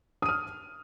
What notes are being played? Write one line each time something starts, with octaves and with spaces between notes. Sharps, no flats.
D#6 F6 D#7